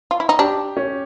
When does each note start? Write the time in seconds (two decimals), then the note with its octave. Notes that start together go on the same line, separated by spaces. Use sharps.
0.11 F4
0.20 E4
0.29 D#4
0.39 D4 G4
0.77 C#4